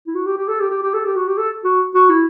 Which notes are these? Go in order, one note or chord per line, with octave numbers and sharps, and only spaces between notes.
E4
F#4
G4
G4
A4
G4
G4
G4
A4
G4
F#4
G4
A4
F#4
F#4
E4